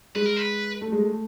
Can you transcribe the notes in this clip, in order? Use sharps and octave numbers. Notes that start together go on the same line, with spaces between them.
G#3 B4
A#4
B4
A3
G#3
A3